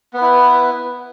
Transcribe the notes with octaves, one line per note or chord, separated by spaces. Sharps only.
B3 E4 B4